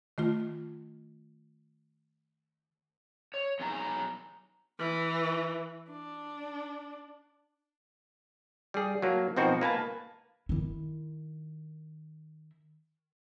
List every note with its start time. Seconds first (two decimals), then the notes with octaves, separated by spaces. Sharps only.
0.18 D#3 A3 F4
3.34 C#5
3.60 B2 D#3 F#3 G#4 G#5 A#5
4.79 E3
5.90 D4
8.74 G3 G#4
9.02 F#3 A#3 A5
9.37 B2 F3 C4 D#4 F#4 A#4
9.61 A#3 B4 G#5 A5
10.49 D#3 E4